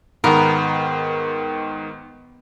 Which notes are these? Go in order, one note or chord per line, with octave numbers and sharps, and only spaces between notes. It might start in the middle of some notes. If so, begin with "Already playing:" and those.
G#2 D#3 B3 A#4